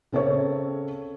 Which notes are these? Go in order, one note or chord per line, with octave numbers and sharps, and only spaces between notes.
C#3 C4 A4 A#4 C#5